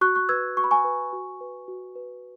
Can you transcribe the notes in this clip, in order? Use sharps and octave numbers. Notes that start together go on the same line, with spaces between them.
F#4 C#6 F#6
C#6 F#6
B4 E6 G#6
F#4 C#6
B5
G#5 C#6
B4
F#4
B4
F#4
B4